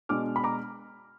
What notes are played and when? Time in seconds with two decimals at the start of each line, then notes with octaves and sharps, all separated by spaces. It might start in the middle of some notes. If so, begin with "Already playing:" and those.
0.09 B2 G#3 D4 D6 F6
0.36 B5
0.44 A#5 D6